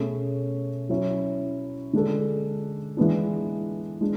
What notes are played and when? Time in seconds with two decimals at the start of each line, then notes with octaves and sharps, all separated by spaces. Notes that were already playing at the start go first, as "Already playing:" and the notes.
Already playing: B2 A3 C#4 G#4 C#5
0.89 F#3 C#4 E4
1.93 D3 G#3 D4 A4
2.97 E3 G#3 B3 D4
4.01 G#3 D4